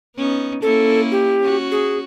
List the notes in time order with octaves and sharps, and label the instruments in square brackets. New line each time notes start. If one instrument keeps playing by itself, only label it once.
[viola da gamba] B3 C#4 D#4
[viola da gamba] A#3 C#4 E4 [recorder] A4
[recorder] G4
[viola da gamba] C#4 F#4
[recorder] G#4